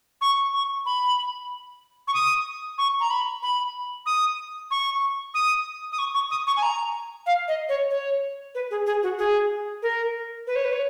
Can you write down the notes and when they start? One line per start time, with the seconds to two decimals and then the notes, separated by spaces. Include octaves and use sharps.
0.21 C#6
0.53 C#6
0.86 B5
2.08 C#6
2.14 D#6
2.78 C#6
3.00 A#5
3.10 B5
3.43 B5
4.06 D#6
4.71 C#6
5.34 D#6
5.92 D#6
5.98 C#6
6.14 C#6
6.31 D#6
6.47 C#6
6.57 G#5
6.62 A#5
7.26 F5
7.48 D#5
7.69 C#5
7.90 C#5
8.55 B4
8.71 G#4
8.86 G#4
9.03 F#4
9.19 G#4
9.82 A#4
10.47 B4
10.56 C#5
10.64 B4
10.72 C#5